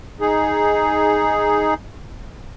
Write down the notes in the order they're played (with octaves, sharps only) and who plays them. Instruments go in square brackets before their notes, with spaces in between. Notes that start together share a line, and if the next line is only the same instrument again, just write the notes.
[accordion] D#4 G#4